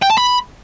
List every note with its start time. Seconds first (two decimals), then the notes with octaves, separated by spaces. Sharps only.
0.02 G5
0.10 A5
0.17 B5